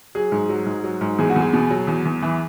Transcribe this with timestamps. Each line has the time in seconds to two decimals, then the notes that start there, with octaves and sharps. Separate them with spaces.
0.15 F#3 G#4
0.32 G#2
0.49 F#3
0.66 G#2
0.84 F#3
1.01 G#2
1.18 E2 G#4
1.30 F#4
1.36 E2 G#4
1.53 B2
1.71 F#3
1.87 E2
2.05 E2
2.22 E3